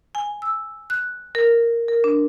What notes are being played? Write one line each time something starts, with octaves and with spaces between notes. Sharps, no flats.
G#5
E6
F#6
A#4
A#4
D4